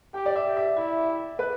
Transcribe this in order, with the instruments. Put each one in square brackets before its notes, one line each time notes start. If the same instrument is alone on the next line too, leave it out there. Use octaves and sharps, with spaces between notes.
[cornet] G4 [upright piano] G5
[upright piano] D5
E5
[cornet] G4
[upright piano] E5
[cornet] E4 [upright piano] E5
[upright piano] B4